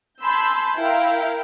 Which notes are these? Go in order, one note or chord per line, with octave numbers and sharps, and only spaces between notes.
G#5 A5 B5 C6 E6 G6
E4 A#4 F5 G5